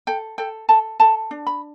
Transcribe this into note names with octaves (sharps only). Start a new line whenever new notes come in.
A4 G5
A4 G5
A4 A5
A4 A5
D4
B5